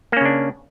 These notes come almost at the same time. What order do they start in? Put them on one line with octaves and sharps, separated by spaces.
A#3 C#4 C#3 D4